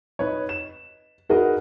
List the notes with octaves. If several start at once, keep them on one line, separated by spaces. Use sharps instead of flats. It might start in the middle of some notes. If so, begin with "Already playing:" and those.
D#4 B4 C#5
E7
D#4 F#4 G#4 A#4 B4 D#5